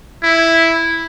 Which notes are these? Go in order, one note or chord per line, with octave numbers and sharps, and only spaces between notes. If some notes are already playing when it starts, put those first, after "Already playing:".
E4